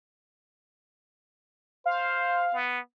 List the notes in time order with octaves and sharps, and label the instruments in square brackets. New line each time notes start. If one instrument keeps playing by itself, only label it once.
[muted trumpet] C5 [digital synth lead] F5
[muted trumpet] B3